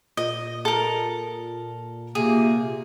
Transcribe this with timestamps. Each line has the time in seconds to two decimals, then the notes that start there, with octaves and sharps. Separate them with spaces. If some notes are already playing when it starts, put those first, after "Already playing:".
0.17 A#2 D#5
0.65 A4 A#4
2.15 C3 A#3 G#4